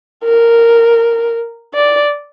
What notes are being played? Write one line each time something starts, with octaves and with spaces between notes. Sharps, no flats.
A#4
D5